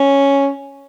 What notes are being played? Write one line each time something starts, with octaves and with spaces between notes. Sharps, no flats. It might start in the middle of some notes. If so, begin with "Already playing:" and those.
Already playing: C#4